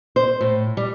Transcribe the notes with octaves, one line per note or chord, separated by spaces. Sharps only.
C5
A2
G3